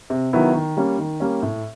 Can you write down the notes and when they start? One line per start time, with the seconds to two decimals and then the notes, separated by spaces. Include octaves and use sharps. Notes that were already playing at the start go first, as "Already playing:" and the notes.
0.10 C3
0.33 D#3 F#3 B3 E4
0.55 D#3
0.77 G3 A#3 C#4
0.99 D#3
1.20 G3 A#3 C#4
1.42 A2